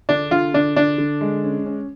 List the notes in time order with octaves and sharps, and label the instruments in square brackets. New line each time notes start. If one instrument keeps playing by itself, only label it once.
[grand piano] D3 [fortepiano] D4
[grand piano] D3 [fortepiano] F4
[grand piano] D3 [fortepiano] D4
[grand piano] D3 [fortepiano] D4
[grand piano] D3
G#3
C#4
C#4